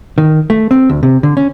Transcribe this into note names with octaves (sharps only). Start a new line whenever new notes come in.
D#3
A3
C4
D2
C3
D3
C#4